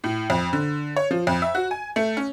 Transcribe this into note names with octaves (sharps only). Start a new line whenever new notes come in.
A2
F2
D3
C#5
F3
F2
E5
F#4
G#5
A3
C#4